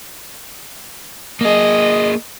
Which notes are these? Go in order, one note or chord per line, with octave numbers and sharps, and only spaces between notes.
A#3 G#4 D#5